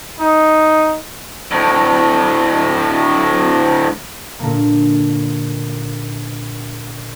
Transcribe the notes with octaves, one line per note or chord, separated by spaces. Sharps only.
D#4
D2 A2
A#2 D3 A#3